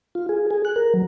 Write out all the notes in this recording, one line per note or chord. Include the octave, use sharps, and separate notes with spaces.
F4
G#4
G#4
F#6
A#4
F#3